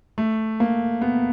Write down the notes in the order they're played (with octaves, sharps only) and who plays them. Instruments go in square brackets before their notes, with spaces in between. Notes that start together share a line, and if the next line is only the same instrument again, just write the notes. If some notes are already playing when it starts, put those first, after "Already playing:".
[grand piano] A3
A#3
B3